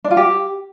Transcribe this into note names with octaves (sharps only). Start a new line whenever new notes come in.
D4
F4
G4